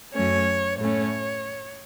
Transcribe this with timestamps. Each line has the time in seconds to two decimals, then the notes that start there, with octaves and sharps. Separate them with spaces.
0.14 F#2 F#3 A3 C#4 C#5
0.78 A2 A3 C#4 C#5